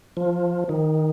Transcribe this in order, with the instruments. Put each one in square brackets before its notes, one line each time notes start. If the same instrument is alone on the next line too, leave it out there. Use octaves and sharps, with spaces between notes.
[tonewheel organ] F3
D#3